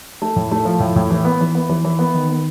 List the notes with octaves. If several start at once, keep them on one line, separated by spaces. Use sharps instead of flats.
A3
A2
A3
F3
A2
A2
E3
B3
E3
B3
E3
E3
B3
D#3
B3